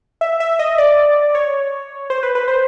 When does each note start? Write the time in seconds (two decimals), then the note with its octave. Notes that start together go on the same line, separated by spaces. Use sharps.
0.21 E5
0.40 E5
0.59 D#5
0.78 D5
1.35 C#5
2.10 C5
2.23 B4
2.35 B4
2.48 C5